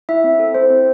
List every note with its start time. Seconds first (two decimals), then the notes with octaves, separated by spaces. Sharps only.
0.09 E4 E5
0.24 C4
0.39 A4
0.54 C4 C5
0.70 C4